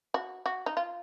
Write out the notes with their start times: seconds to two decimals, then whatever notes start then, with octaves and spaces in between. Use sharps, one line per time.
0.14 F#4
0.46 F#4
0.66 D#4
0.77 F4